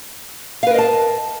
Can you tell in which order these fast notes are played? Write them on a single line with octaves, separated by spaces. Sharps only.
F5 B4 A#4 D#5 A5